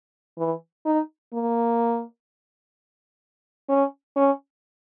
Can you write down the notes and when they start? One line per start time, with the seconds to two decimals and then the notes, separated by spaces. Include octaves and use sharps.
0.38 E3
0.86 D#4
1.33 A#3
3.69 C#4
4.16 C#4